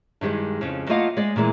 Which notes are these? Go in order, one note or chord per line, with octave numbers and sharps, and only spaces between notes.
G2 D#3 F3 G3 G#3
F2 C#3
A3 A#3 F4 D#5 F5 F#5
G#3 D5 D#5
A#2 E3 G#3 A#3